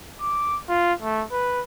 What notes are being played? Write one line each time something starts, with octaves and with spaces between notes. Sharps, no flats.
D6
F4
A3
B4